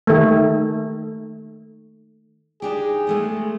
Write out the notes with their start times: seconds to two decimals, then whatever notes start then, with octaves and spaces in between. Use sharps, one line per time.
0.07 D#3 A3
2.62 D4 D#4 G4 G#4
3.07 G#3 A3 B3